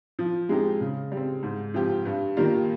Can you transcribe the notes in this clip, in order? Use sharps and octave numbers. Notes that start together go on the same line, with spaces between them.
F3
G#3 C4 D#4 G4
C#3
G3 C4
G#2
F3 C4 G4
G2
D#3 G3 A#3 F4